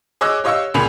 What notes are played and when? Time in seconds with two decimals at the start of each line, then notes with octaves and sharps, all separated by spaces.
0.21 G#4 C#5 D#5 D6 E6 F#6
0.44 G4 C#5 D#5 F5 C#6 E6
0.74 C#2 A#2 G#4 B5 F7